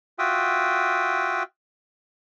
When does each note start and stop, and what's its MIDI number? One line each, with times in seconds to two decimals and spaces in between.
0.19 1.43 65
0.19 1.43 66
0.19 1.43 76
0.19 1.43 79
0.19 1.43 87